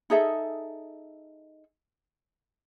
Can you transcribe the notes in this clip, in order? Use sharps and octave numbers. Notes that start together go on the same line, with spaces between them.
D#4 G#4 A4 E5